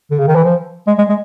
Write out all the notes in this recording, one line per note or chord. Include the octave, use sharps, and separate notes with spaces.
D3
C#3
D#3
E3
F3
G#3
G#3
G#3